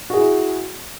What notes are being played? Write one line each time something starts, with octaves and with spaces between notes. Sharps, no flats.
E4 F#4 G#4